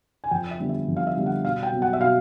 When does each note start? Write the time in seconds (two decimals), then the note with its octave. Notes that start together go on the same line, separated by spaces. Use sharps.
0.24 G#5
0.31 F2 G5
0.51 E5
0.60 D3 G3 B3
0.69 E5
0.88 F2
0.97 F5
1.07 E5
1.17 D3 G3 B3
1.26 F#5
1.44 B2 F5
1.63 G5
1.72 F#3 B3
1.82 F#5
1.93 E5
2.00 B2 F5